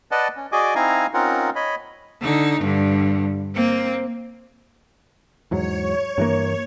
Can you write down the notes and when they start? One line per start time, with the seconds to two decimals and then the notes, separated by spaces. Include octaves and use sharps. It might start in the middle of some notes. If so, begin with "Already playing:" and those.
0.11 B4 D5 D#5 F#5 A5
0.36 C#4
0.52 F#4 G#4 D5 D#5 G#5 D6
0.75 C4 D#4 E4 F5 G#5 A#5
1.14 C4 C#4 D#4 F4 A#4 F#5
1.56 C#5 D#5 B5
2.21 D3 D#4
2.61 G2 D3
3.55 A#3 C4
5.51 E2 G#2 F#3 C#5
6.18 G2 E3 A#3